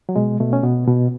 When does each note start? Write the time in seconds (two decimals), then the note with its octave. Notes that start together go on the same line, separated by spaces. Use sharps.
0.09 F#3
0.16 B2 G#3
0.40 B2 A3
0.53 C#4
0.63 B2 B3
0.87 B2